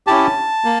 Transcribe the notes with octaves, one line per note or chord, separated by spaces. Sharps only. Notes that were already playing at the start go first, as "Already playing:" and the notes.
C#4 E4 G4 A5
A#3